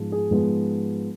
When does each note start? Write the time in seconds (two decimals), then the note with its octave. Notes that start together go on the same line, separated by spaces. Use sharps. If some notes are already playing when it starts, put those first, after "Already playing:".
Already playing: G#2 F3 G#3 B3
0.12 G#4
0.31 G#2 F3 G#3 B3